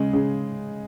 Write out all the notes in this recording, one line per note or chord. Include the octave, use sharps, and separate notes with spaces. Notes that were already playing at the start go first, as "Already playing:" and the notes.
Already playing: C#3 G#3
C#3